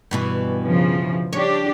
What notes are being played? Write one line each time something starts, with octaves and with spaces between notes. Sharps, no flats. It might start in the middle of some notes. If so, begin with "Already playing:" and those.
G2 B2 E3
C#3 F3
D4 G4 C#5